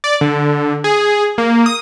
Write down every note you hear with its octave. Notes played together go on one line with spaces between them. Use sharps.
D5
D3
G#4
A#3
D#6